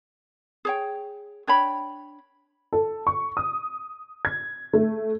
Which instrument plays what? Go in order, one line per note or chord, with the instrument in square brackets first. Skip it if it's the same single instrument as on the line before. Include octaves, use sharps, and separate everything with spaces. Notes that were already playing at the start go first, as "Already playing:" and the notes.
[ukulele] G#4 C#5 G5
D4 C#5 G5 B5
[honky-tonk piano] A4
C#6
D#6
G#6
A3